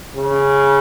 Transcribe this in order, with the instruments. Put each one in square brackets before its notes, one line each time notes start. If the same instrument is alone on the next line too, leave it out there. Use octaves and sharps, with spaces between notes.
[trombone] C#3